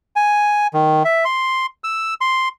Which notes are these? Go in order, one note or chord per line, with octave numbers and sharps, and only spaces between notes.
G#5
D#3
E5
C6
E6
C6